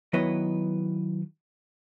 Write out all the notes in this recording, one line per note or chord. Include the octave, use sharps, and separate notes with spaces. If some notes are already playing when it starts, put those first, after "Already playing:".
D#3 F#3 B3 E4 B4 D#5